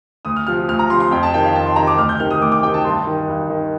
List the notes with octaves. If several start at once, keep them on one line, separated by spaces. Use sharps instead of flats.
D2 D#6
F6
C3 F3 F6
D2 F6
A#5
C3 F3 C6
C6
F2 G5
A5
C3 D#3 G5
F5
F2 A5
C6
C3 D#3 A#5
D6
D2 F6
G6
C3 D#3 F6
D#6
D2 D6
D6
C3 D#3 G5
A5
G2 C6
D#3
G2
D#3